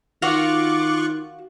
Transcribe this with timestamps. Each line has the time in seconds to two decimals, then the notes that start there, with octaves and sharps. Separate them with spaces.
0.22 D#3 F4 F#4 F5 C#6 D6 F#6